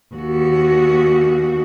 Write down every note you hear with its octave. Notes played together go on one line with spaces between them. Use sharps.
D#2 F#4